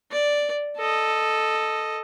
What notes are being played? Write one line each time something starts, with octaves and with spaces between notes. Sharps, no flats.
D5
A4 D#5